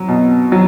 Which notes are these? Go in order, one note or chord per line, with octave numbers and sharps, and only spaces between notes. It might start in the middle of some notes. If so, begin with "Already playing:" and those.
Already playing: F#3
B2
F#3